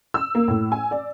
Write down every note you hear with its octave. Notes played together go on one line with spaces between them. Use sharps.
E6
A#3
A2
G#5
D5